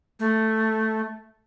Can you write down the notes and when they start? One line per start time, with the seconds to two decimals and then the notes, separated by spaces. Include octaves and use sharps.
0.20 A3